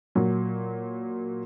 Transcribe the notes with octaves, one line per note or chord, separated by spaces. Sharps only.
A#2 F#3